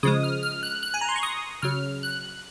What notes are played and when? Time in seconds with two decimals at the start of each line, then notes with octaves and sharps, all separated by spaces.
0.03 C#3 F3 G#3 D#6
0.23 F6
0.43 F6
0.63 F#6
0.83 F#6
0.94 G#5
1.01 A#5
1.09 C6
1.16 C#6
1.23 D#6
1.62 C#3 F#3 F6
2.03 F#6